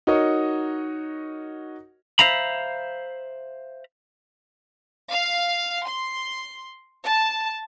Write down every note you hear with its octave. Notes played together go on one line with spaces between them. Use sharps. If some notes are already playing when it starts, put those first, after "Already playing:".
D#4 F#4 A#4 C#5 D#5
C5 E5 F5 A#5 B5
F5
C6
A5